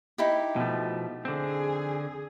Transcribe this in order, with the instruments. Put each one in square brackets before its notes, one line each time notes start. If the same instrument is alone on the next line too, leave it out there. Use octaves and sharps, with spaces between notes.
[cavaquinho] D#4 E4 G4
[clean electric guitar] B2 F3 A3
[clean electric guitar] D3 C4 [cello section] G#4